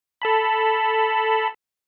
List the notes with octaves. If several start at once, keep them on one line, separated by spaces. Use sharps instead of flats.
A4 A5 B5